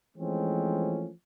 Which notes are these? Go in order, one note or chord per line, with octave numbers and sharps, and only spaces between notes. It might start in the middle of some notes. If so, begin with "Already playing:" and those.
E3 F3 G#3 A3 C4 C#4